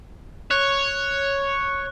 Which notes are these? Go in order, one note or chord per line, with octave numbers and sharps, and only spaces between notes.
C#5 F#6